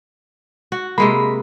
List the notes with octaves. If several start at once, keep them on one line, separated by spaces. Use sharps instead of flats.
F#4
C3 G#3 A#3 B5